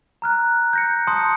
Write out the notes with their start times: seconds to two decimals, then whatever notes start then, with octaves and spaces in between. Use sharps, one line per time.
0.22 A#5 F6 F#6
0.73 G6 A#6 C#7
1.07 A5 C6 D#6 C#7